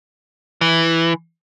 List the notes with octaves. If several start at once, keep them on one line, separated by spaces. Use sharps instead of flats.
E3